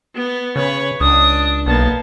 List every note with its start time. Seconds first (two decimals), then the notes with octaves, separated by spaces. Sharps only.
0.15 B3
0.56 C#3 B4 C#5
1.00 C#2 D4 D#6
1.66 B1 A#3 B3 A5